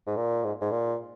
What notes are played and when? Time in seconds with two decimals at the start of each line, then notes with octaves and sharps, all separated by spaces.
0.06 G#2
0.17 A#2
0.44 G#2
0.61 G#2
0.71 A#2